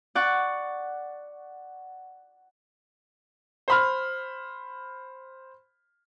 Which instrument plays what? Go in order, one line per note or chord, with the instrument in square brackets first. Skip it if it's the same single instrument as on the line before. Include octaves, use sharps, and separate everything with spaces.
[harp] D5 F#5 C#6
[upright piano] C5 B5 F6